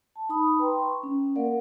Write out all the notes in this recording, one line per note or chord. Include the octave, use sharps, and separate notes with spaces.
A5
D#4 B5 D#6
B4 G5 A#5 C6
C#6
C#4
A#3 A#4 D5 F5 F#5